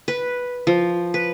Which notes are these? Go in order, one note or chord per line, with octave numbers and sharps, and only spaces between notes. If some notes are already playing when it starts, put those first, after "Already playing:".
B4
F3
B4